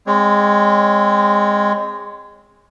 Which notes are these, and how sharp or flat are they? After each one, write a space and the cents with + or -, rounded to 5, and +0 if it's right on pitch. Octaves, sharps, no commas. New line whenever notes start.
G#3 -20 C4 -5 C#5 +0